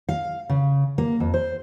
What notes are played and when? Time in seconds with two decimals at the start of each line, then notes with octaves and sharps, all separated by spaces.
0.09 F5
0.50 C#3
0.98 A#3
1.20 F2
1.34 C5